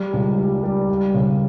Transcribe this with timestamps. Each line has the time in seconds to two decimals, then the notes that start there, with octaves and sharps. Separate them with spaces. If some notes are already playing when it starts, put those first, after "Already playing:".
Already playing: G3
0.13 C#2
0.38 G3
0.64 G3
0.90 G3
1.14 C#3